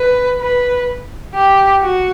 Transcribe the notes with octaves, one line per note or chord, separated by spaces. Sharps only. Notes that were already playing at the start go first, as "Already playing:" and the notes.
Already playing: B4
B4
G4
F#4